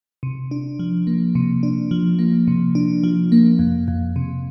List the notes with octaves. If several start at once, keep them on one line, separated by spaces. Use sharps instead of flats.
C3
D4
F3
A#3
C3
D4
F3
A#3
C3
D4
F3
A#3
F2
F2
C3